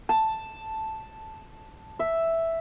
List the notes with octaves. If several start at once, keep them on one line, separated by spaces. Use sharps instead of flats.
A5
E5